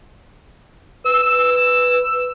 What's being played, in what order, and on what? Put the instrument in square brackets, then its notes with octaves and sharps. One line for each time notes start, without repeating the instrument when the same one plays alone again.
[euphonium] B4 [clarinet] E6